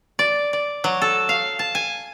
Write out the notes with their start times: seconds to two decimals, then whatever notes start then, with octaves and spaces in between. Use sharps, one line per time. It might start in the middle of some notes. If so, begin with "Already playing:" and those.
0.19 D5
0.53 D5
0.84 F#3
1.02 A4
1.29 F5
1.59 A5
1.75 G#5